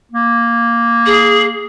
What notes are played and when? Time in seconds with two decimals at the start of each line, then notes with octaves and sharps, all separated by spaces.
0.12 A#3
1.06 G#4